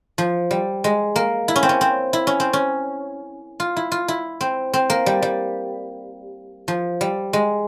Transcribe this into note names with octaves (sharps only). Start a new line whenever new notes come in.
F3
G3
G#3
A#3
E4
C#4
C4
C#4
C4
E4
C#4
C4
C#4
F4
E4
F4
E4
C4
C4
A#3
G3
G3
F3
G3
G#3